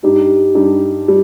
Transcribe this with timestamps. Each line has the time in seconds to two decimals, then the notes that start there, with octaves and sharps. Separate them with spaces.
0.03 G2 G3 D#4 G4
0.55 G2 G3 D#4 G4
1.08 G3